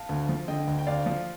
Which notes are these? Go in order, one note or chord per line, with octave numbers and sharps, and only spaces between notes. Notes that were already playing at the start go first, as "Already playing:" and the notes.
Already playing: F5 A5
D2
F3
D3 D#5 G5
D2
G5
D2 D5 F5
F3